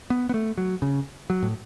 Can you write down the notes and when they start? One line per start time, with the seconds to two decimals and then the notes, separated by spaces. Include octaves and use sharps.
0.10 B3
0.29 B3
0.34 A3
0.58 F#3
0.82 C#3
1.30 F#3
1.42 A2